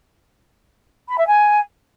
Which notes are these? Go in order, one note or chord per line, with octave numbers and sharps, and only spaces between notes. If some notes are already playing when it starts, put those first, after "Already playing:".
B5
E5
G#5